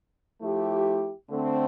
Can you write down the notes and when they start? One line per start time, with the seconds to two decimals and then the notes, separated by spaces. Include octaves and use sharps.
0.40 F3 A3 E4 G4
1.29 D3 A3 C4